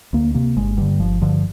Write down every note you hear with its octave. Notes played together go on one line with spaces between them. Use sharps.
D2 A#3
C3 A#3
G1 G#3
G2 D3 G3
G1 F3
G2 D3 F3